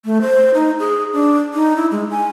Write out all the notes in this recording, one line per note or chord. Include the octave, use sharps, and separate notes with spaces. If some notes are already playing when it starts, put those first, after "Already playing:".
A3
C5
D#4
G#4
D4
D#4
E4
G#3
G#5